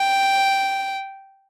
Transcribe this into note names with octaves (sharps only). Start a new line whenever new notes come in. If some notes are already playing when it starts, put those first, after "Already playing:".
Already playing: G5